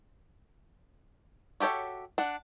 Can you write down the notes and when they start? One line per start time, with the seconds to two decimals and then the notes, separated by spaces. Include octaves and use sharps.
1.60 F#4 G4 A4 C#5 E5
2.18 D4 F#5